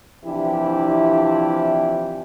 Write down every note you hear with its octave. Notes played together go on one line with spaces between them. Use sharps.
C3 E3 F3 D4 E4 G4